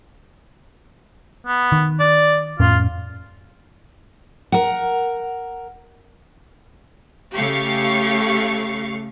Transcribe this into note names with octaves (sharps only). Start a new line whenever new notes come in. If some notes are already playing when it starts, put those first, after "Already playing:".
B3
D#3
D5
F2 A2 C#4 F4
A#4 F#5
C#3 A3 G4 F5 C#6